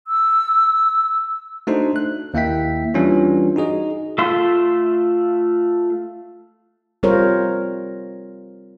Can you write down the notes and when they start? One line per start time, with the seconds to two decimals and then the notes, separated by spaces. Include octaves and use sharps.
0.07 E6
1.67 A3 D4 D#4 F#4 A4 C5
1.96 F#6
2.34 D#2 A#3 E4 E5 G5 B6
2.94 E3 G3 C#4 D4 F4
3.56 D#4 F#4 G#4 D#5
4.18 A3 F4 E5 C6
7.03 G3 C4 F4 A#4 C5 C#5